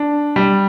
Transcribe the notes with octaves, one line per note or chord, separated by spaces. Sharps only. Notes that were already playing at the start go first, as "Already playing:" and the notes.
Already playing: D4
G3